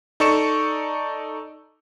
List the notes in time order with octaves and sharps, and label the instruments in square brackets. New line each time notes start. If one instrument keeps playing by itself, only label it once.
[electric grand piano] D#4 A4 D5 C#6 C#7 E7